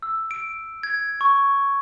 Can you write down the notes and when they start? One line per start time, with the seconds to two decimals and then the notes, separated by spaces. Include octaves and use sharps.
0.02 E6
0.31 D7
0.83 G#6
1.21 C#6